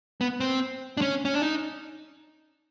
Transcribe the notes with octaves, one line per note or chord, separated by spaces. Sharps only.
B3
C4
D4
C#4
C#4
D4
D#4